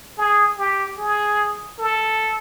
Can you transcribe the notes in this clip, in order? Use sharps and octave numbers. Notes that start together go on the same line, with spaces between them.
G#4
G4
G#4
A4